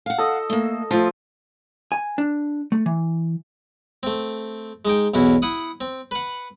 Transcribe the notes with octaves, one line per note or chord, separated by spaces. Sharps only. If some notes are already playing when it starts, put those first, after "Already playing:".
F5 F#5
A4 D#5
A3 A#3
F3 A3 F4
G#5
D4
A3
E3
A3 C4
G#3 D#4 G5
B1 E2 C#4 E4 F#4
E4 F#5 D#6
C4
B4 F#5